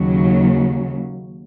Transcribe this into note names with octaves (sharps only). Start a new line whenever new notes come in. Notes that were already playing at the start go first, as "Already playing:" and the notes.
Already playing: D#2 C#3 F#3